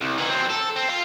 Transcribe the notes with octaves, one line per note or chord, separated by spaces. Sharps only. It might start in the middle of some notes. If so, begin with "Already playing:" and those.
C2
E3 D#4
F#3 C4
A4
C4
F5 C6